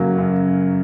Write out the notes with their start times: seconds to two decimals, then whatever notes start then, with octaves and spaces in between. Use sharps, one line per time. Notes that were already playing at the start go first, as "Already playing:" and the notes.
Already playing: F#2 C#3 F#3 A#3
0.18 F#2